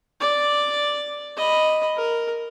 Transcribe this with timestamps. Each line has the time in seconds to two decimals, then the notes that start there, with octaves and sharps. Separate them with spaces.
0.21 D5
1.37 D#5 B5
1.97 A#4